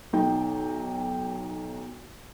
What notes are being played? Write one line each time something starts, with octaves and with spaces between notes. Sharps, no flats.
B1 D#4 G5